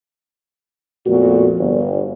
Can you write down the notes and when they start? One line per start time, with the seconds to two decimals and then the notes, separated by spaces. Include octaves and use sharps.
1.06 F2 A#2 A3 B3 F#4
1.59 G1